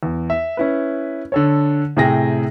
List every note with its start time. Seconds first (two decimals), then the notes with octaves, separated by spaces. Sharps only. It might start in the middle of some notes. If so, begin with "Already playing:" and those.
0.03 E2
0.30 E5
0.57 C#4 E4 B4
1.32 D3 A4 C#5
1.97 A2 C3 G#4 G5 A#6